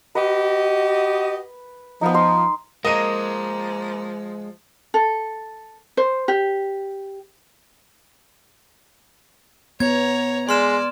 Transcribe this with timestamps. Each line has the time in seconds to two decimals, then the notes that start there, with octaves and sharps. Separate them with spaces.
0.15 F#4 G4 B4 D#5
2.01 F3 B3 D#4
2.14 D#5 C6
2.85 F3 G#3 A#3 A#4 D#5 D#7
4.94 A4
5.97 C5
6.28 G4
9.80 B3 C#5 A#5 G#6
10.49 G#3 D5 C6 F6 E7